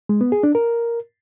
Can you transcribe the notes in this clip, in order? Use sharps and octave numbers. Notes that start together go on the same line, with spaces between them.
G#3
B3
G#4
D4
A#4